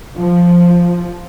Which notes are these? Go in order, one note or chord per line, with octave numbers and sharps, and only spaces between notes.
F3